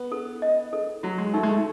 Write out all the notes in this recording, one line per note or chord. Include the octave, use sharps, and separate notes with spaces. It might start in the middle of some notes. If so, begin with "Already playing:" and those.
Already playing: B3
A4
D#5
A4
F#3 F#4
G#3
A3 D#4
G#3
A3